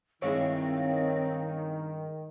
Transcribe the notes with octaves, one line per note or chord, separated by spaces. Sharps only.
G2 D#3 G#3 C4 E4 C#5 F5